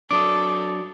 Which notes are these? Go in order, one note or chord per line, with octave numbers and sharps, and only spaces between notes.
F#3 D4 A4 D6 D#6